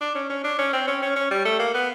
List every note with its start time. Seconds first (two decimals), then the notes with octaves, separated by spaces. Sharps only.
0.01 D4
0.15 C#4
0.30 C#4
0.44 D4
0.58 C#4
0.73 C4
0.87 C#4
1.02 C#4
1.16 C#4
1.31 G3
1.45 A3
1.59 A#3
1.74 B3